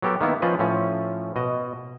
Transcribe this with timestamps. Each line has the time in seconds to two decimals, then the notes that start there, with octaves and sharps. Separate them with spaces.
0.02 F#3 B3 G4 A4 A#4
0.21 D#3 A#3 B3 E4
0.42 F3 C#4 F4 B4 D#5
0.59 A2 F3 C#4
1.36 B2 D#5